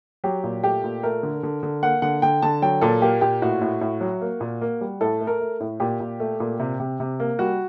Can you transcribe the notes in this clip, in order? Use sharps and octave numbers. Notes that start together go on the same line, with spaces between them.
F#3 G4
A#2
A3 G4
A#2
A3 A#4
D3
D3
D3
A#3 F#5
D3 F#5
D3 G5
D3 A5
F#3 G5
A#2 A4
A#3 G4
A#2 G4
A2 F#4
A2
A2
F#3
A#3
A#2
A#3
G3
A2 A4
A3
A#4
A3
A2
A#2 G4
A#2
A3
A#2
C3
C3
C3
A#3
G3 F#4